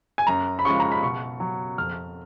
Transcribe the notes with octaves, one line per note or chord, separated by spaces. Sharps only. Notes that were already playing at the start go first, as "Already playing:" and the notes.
G#5
F#2 A#5
B5
C#3 F3 G#3 C#6
A#5
B5
B2 C#6
F#3
F2 F6